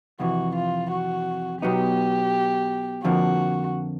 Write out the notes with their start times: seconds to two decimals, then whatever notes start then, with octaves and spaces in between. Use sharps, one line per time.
0.20 F2 C3 E3 F#4
0.55 F4
0.92 F#4
1.62 B2 F#3 B3 D#4 G4
3.04 F2 D3 F3 A#3 F#4